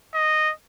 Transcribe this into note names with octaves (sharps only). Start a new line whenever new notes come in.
D#5